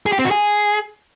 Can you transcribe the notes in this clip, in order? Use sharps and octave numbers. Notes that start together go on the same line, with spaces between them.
G#4
G4
C4
F#4
G#4